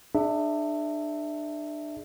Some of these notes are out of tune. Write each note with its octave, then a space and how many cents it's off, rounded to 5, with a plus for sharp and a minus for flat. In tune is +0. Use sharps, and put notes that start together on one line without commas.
D4 +30 G#4 +0 E5 +0